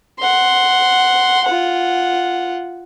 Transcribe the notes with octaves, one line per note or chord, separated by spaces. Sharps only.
F#5 C6
F4 F#5